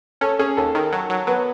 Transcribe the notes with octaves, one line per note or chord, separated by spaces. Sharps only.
C#4 A4
C#4 G#4
D#2 A4
D#3
F#3
F#3
F#3 B3 B4